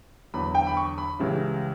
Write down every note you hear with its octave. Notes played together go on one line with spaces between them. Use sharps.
E2 D3 F#3 B5
G5
B5
C#6
B5
C#2 C#3 E3 G3